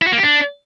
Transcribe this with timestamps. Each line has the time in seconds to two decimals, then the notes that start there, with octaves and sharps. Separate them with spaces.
0.02 E4
0.07 F#4
0.12 A#3
0.18 G4
0.23 D4